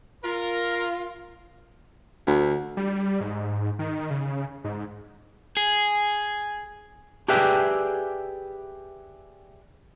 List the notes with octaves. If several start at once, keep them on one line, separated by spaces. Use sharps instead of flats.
F4 A#4
D2
G3
G#2
D#3
C#3
G#2
G#4
G4 G#4 B4 D5 E5 G5